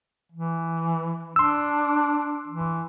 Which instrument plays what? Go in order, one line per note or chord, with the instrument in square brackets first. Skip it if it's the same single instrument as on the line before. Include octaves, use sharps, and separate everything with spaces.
[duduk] E3
[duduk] D4 [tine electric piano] C6 E6
[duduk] E3